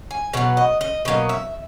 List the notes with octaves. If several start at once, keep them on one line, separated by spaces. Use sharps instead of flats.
G#5
B2 F#3 B3 F#5
D#5
D#5
B2 F#3 A#3 D#5
E5